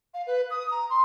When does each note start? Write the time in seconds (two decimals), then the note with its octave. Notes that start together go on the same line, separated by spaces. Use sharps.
0.14 F5
0.26 B4
0.50 D#6
0.71 A#5
0.90 C6